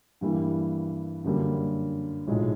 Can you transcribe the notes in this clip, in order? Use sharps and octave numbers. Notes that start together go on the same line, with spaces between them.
G2 E3 G3 A#3
F#2 D3 G3 A#3
B1 A2 F3 G#3